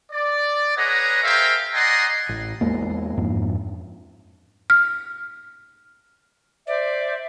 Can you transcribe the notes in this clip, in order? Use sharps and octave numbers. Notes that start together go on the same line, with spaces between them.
D5
G#4 B4 C#5 D#5 F#5 A#5
G#4 A#4 C5 E5 F5 G5
D5 D#5 F#5 G#5 A#5 C6
A1
E2 G#3 A#3
F2 G#2
F6
C5 D5 E5